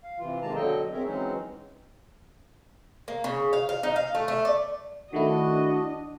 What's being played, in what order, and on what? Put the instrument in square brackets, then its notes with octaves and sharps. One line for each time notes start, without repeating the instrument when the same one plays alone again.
[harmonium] F5
C3 E3 F4
C3 D#3 G#3 A#3 A5 A#5
B2 D3 F#3 A4 D#5 G5
F2 C4 G#4 A#4 C#5 E5
E3 F#3 G#3 C4 C#4 D#4
[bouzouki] A#3
C#3
F5
F5
D#4
F5
A3
A3
D5
[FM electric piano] D#3 A3 E4 [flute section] D4 [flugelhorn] F#4 [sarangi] D#5